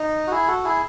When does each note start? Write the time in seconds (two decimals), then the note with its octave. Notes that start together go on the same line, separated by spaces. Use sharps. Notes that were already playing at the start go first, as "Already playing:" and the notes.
Already playing: D#4
0.27 F#4
0.31 E4 G#4
0.48 F#4 A4
0.64 E4 G#4